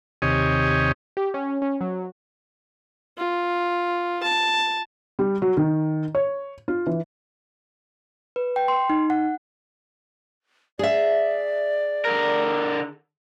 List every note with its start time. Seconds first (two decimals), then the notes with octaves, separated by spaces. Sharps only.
0.22 D#2 C3 G4 C#5 D#5 G#5
1.17 G4
1.34 C#4
1.62 C#4
1.81 F#3
3.18 F4
4.23 A5
5.19 G3
5.42 F#3
5.57 D#3
6.15 C#5
6.68 F4
6.86 E3
8.36 B4
8.56 G5
8.68 C6
8.90 D#4
9.10 F#5
10.79 G#4 D5 E5
12.05 D3 A#4